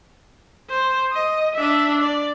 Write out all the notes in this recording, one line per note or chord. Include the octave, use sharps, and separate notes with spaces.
C5
D#5
D4 E5
D5